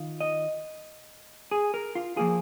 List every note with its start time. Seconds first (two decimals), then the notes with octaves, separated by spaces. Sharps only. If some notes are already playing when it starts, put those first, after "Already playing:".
Already playing: D#3 F4
0.21 D#5
1.51 G#4
1.74 A#4
1.95 F4
2.16 F3 A#3 F4 G#4